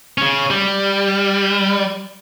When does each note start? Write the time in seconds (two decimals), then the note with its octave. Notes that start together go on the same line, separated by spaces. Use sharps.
0.18 C#3 C#4
0.51 G3